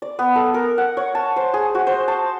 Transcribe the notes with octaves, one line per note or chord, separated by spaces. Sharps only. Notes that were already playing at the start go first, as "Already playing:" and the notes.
D5
B3
A4
A#4
F#5
C#5
A5
C5
G#4
F#4
C5
A5